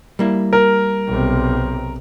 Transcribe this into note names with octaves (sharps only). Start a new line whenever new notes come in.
G3 A#3 E4
A#4
B1 C3